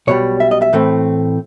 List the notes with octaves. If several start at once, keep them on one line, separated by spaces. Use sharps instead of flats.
B1 B2 G3 C#5
E5
D#5
E5
A2 E3 A3 C4